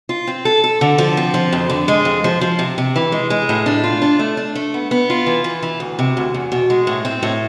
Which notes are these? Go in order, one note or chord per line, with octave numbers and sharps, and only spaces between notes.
F4
C4
A4
A4
D3
F3
C4
F3
F2
D3
G#3
F2
F3
F3
C3
C3
E3
G#3
G#3
A2
D4
F4
D4
A3
D4
A3
B3
B3
F4
E3
E3
E3
D2
C3
D2
E2
B2
G#3
A2
C4
A2